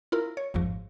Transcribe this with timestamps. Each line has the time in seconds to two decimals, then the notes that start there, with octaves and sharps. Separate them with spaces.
0.12 E4 F4 A#4
0.37 C#5
0.54 G#1 F2 G#2 F3